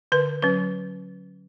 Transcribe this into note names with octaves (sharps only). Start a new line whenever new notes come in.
D3 B4
F#3 C#4 B4